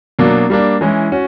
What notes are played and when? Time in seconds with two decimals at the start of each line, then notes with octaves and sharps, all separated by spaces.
0.19 B2 F#3 A#3 D4
0.50 G3 A#3 D4
0.81 E3 G#3 C#4 E4
1.12 C#4 F#4